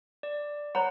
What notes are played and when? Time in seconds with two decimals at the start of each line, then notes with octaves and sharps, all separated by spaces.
0.23 D5
0.75 C#5 F#5 A#5 B5